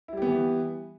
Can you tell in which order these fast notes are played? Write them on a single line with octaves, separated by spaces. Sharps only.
E4 G3 G4 B3 E3